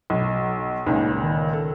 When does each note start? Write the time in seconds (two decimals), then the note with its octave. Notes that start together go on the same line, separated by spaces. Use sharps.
0.10 B1
0.86 C#2 A#2 C#3 D#4
1.23 D#3
1.53 A4